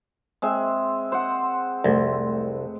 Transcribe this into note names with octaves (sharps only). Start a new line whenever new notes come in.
G#3 C4 E5
C5 F#5
F1 C2 A3